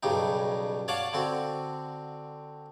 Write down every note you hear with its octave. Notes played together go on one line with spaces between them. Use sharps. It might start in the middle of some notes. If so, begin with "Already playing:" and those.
B1 G2 C#3 G3 D#4
C#5 D5 F5 F#5 A5 D6
D3 C4 F#4